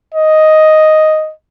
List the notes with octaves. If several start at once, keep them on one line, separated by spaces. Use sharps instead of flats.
D#5